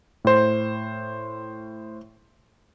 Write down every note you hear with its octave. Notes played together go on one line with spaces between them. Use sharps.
A2 C5